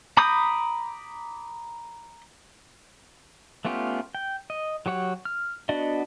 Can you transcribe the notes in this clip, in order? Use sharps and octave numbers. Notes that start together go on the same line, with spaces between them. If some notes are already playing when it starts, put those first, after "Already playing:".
A#5 B5 D6 D#6 G6
A3 B3 C#4 F4 G4
G5
D#5
F#3 G4 C#5 F#5
F6
B3 D4 F#4 D5 D#5